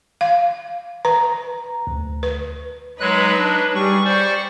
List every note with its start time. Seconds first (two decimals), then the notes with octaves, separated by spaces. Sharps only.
0.21 F5
1.05 B4 A#5
1.87 D2
2.23 B4
3.00 F#3 G#3 D#4 B4 C#5 F#6
3.36 D4
3.75 G3 G#4 C#6
4.05 G4 C5 D5 C#6